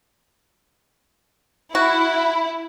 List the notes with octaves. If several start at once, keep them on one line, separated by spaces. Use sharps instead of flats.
E4 F#4